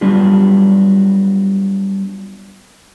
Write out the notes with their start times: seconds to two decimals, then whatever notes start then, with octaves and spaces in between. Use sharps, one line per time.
0.01 F#3 G3 B3 D4 F4 G4